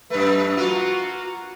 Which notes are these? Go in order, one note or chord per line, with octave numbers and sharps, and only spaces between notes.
F#2 A3 B4
A#3 F4 F#4